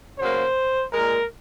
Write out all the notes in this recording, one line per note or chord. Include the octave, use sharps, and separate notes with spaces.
C#3 F#3 A#3 C5
A#2 G#3 A#4